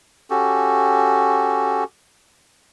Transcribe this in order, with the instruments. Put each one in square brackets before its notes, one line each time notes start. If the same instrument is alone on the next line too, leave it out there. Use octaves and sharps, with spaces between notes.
[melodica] C#4 F#4 G4 A4